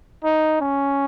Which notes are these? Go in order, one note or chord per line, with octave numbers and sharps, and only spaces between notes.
D#4
C#4